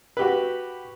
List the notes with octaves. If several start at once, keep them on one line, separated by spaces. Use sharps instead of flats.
F#4 G4 B4